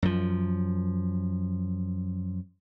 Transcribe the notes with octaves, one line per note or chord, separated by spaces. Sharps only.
F#2 F3